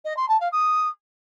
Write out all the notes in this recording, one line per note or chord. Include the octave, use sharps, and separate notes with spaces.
D#5
C6
A5
F5
D#6